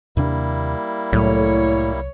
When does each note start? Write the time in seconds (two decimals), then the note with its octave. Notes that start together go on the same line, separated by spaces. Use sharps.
0.17 D#2 C3 G3 A#3 D4 E4
1.13 C2 A2 F#3 C#5